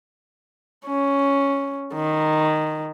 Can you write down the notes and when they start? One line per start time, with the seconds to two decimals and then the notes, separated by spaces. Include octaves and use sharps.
0.86 C#4
1.94 D#3